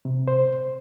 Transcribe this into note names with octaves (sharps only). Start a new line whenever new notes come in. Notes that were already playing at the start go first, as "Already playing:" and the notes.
C3
C5